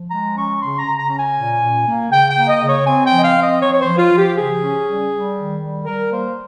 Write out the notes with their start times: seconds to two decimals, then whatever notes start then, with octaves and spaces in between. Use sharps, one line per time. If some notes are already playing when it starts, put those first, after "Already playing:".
Already playing: F3
0.10 G#3 A#5
0.35 C#4 C#6
0.60 C#3 C6
0.79 A#5
0.85 C#3
0.97 A#5
1.10 C#4
1.17 G#5
1.36 A#2
1.61 A#2
1.86 A#3
2.10 C#3 G5
2.29 G5
2.35 A#3
2.48 D#5
2.61 C#3
2.67 C#5
2.86 C4 G#5
3.05 G5
3.11 F3
3.18 D#5
3.23 F5
3.36 C4
3.42 D#5
3.61 F3 C#5
3.73 C#5
3.80 C5
3.86 F3
3.98 F4
4.12 F3
4.17 G4
4.35 C#3 G#4
4.61 C#4
4.86 G3
5.11 G3
5.36 D#3
5.61 G3
5.86 G3 A#4
6.11 A#3 C5